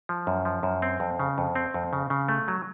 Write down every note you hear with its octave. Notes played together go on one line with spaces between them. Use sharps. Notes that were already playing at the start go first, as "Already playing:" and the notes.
F3
F#2
F3
F#2
C4
F2
C#3
F2
C4
F2
C#3
C#3
A3
F#3